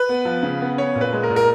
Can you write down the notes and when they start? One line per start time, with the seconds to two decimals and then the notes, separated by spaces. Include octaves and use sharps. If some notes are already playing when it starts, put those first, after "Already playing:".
Already playing: B4
0.09 B3
0.25 F3
0.43 C#3
0.61 B3
0.77 C#4 C#5
0.95 A#2
1.01 B4
1.13 G#3
1.23 A#4
1.30 A#2
1.36 A#4